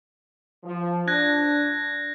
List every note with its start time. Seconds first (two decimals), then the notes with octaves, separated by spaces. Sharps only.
0.64 F3
1.08 D4 F#6 G#6 A#6